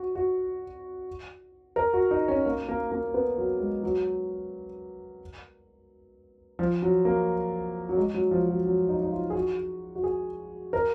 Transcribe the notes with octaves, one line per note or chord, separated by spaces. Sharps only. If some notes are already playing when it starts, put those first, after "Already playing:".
Already playing: F#4
F#4
A#4
F#4
D#4
C#4
A#3
A#3
A#3
B3
F#3
G#3
F#3
F3
F#3
A#3
F#3
G#3
F#3
F3
F#3
F#3
D#4
D#4
F4
G#4
F#4
F#4
G#4
A#4